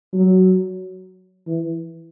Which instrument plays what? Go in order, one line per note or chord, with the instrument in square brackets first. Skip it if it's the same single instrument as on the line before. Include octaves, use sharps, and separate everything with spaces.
[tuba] F#3
E3